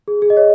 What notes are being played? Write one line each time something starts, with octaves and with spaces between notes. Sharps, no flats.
G#4
G#4
D#5
C#5